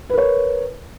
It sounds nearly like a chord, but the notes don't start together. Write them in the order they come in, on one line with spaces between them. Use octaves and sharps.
B4 A#4 C#5